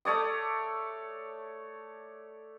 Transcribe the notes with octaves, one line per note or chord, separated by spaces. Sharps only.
A3 C#5 D5 D#6